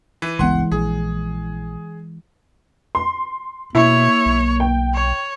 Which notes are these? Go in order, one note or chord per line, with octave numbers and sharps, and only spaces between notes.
E3
G1 C#2 E3 G#3 B3 F#5 C6
A#1 G#4
C6
B2 A#3 E4 C#5
B1
G5
C#5